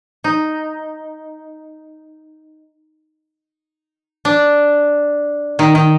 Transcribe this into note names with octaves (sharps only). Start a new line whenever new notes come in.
D#4
D4
D#3
D#3